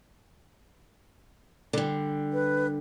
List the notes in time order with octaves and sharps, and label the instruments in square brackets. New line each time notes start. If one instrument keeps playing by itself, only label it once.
[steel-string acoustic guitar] D3 G3
[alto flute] B4